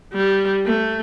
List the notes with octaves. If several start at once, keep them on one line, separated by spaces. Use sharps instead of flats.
G3
A3